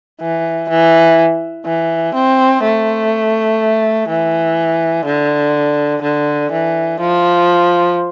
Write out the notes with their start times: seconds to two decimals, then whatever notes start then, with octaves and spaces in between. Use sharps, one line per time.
0.21 E3
0.70 E3
1.66 E3
2.15 C4
2.64 A3
4.09 E3
5.05 D3
6.02 D3
6.52 E3
7.00 F3